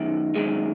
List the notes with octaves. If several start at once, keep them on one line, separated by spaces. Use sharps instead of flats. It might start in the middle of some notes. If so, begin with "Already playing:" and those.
Already playing: F#2 D#3
F#2 D#3 G#3